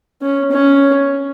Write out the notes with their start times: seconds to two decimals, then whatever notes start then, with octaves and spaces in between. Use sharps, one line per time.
0.22 C#4
0.51 C#4